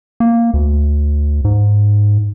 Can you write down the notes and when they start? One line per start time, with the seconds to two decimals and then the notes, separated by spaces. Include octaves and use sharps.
0.20 A#3
0.54 D2
1.45 G#2